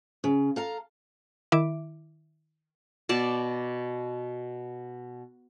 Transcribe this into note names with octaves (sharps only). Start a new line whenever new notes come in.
C#3
A4 F5 A#5
D#3 E4 E5 D6 D7
B2 D5 A5